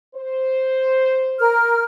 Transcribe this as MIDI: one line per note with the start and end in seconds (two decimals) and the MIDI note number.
0.15 1.58 72
1.39 1.83 70
1.39 1.83 89